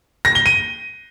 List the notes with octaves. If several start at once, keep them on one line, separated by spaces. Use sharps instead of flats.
A#6
G7
D#7